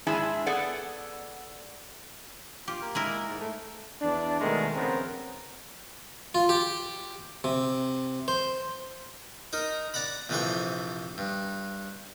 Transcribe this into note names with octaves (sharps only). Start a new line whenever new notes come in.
G#2 D4 E4 G#4 E5 G#5
B3 G#4 A4 D5 F#5
F4 G4
A#3
G#3 E4 A#4
G#2
A3
E2 D4
B2 D#3 G#3 A3 A#4
A#1 C#3 B3 C4 A#4
F4
G4
C3
C5
D#4 A#4
D5 F#5 A#5 B5
A#1 C3 E3 A4 C5 C#6
G2